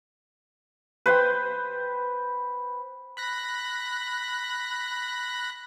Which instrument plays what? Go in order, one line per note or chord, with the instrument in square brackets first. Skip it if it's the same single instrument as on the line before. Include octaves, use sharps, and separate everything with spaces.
[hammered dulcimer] B4 C5 G5
[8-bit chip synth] B5 F#6 A#6